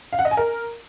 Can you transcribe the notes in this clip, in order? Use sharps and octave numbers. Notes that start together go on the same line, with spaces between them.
F5
F#5
D#5
G#5
A#4